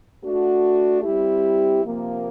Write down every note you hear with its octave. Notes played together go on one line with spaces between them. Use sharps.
A3 D4 F#4
G3 C4 E4 G4
C3 F3 A#3